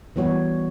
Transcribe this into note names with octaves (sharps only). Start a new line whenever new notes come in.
E3 G3 B3 F#4 C#5